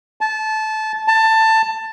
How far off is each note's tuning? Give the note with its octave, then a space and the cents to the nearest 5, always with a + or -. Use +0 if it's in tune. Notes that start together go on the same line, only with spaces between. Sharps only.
A5 -20
A5 +15